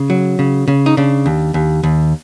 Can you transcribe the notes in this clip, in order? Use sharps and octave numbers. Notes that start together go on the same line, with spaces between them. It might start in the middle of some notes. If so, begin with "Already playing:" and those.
Already playing: C#3
F#3
C#3
C#3
D#4
C#3 D4
D#2
D#2
D#2